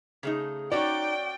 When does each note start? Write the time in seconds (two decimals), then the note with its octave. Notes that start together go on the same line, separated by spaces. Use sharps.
0.23 C#3 A3 D#4 G#4
0.72 C#4 D#4 F#4 C#5 D5 G5